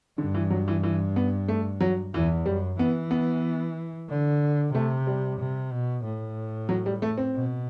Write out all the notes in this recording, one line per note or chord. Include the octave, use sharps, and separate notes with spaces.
G2 D3
E3
F#3
E3
E3
B3
A3
F#3
E2 E3
F#2 G3
E3 B3
B3
D3
C3 A3
G3
C3
B2
A2
F#3
G3
A3
C4
B2